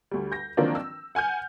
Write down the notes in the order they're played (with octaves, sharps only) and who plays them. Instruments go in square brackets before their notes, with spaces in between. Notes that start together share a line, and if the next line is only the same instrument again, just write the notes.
[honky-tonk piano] D2 G3
G6 A#6
D#3 F3 F#3 A#3 C4 D4
E6
F#5 G#5 F6 G6